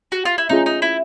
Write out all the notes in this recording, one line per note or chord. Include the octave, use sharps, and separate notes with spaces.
F#4
F4
E4
A3 C#4 D#4 F4 G#4
D#4
E4